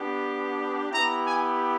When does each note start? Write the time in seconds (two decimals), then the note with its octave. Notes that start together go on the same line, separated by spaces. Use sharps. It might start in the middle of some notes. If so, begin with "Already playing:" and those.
Already playing: B3 D4 G4
0.91 B3 E4 G4 A#5
1.24 G#5